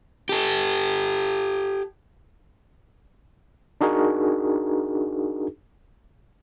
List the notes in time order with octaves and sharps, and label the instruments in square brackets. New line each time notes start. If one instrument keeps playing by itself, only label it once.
[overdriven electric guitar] G4 A4
[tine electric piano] D4 D#4 F#4 G#4 A#4